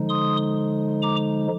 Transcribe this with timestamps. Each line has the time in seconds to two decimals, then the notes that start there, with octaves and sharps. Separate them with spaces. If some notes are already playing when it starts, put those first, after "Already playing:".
Already playing: D3 F3 G#3 D#4
0.09 C6 D#6
1.02 A#5 D6